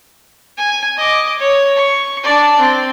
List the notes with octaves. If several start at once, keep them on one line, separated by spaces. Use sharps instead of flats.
G#5
D#5 D6
C#5
C#6
D4 D5
C4